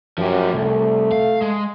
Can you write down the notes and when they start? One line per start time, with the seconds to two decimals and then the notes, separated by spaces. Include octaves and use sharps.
0.18 F#2 F3 G4
0.54 C2 A3
1.12 F5
1.42 G#3